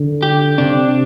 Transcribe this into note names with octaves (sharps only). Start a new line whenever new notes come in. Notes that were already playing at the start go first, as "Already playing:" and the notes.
Already playing: D3
G4
C3 D4